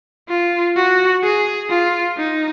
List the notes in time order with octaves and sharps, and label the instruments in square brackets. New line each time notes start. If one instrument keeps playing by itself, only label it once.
[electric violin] F4
F#4
G#4
F4
D#4